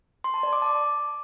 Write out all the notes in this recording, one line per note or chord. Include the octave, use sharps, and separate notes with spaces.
C6
A5
D5
D6
A5